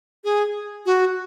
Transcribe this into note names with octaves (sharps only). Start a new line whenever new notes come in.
G#4
F#4